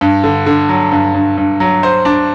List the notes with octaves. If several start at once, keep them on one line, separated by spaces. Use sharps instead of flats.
G2
D3
D3
F#3
G2
G2
G2
F#3
C5
D4